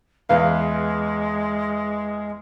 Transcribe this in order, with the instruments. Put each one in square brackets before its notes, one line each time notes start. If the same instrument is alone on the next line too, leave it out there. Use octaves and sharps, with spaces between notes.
[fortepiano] E2 B4 F5 [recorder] G#3